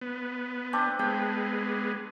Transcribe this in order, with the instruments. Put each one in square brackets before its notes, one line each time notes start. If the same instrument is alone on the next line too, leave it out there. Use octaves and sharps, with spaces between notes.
[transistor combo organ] B3
[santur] C4 D4
[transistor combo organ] G#3 B3 [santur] G5